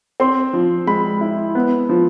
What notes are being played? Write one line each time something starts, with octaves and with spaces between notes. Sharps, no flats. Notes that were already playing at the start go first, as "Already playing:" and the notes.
C4 C6
F3
G#3 B5
E4
B3
F3